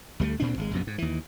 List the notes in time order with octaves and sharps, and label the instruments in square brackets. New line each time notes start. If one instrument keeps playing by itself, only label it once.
[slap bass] D2 G3 A3
D2 A#2 C4 D4
G#1 C3 G#3
A#1 F#2 B2
G#2
D#2 E3